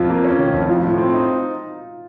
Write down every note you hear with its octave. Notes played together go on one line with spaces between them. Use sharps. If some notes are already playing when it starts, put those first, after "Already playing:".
Already playing: F2 F4
A#3
C#4
D#3
F2
F3 F4
A2
C4
D#4